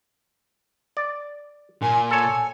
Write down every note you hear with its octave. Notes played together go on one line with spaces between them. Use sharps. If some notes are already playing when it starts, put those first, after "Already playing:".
D5
A#2 G#5
A4 C#5 G#5